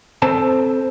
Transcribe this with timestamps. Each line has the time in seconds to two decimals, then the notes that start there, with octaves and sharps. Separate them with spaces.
0.22 C4 A4 C5 A5